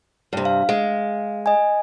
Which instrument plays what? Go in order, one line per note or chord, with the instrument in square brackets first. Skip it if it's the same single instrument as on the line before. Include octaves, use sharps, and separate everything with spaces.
[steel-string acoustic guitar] G2 C3
[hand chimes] F5
[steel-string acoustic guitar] G#3
[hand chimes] D#5 G#5